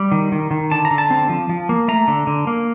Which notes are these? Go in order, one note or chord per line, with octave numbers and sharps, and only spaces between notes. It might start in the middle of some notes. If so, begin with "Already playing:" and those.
Already playing: G3
D#3
D#3
D#3
D3 A5
A#5
D3
A5
C4
F3
F3
A#3
A3 A#5
D3
D3
A#3